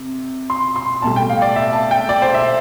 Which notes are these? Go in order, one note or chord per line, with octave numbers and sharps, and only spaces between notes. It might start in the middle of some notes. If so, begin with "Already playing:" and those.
Already playing: C3
C6
C6
B1 A2 G3 A5
G5
F5
D5
E5
A5
G5
D5
C5
E5